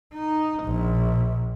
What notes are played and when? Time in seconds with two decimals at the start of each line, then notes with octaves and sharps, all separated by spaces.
0.14 D#4
0.64 A#1